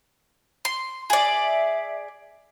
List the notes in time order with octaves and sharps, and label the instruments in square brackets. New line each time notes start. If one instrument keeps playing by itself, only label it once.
[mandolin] C6
[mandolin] G#4 D5 [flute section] E5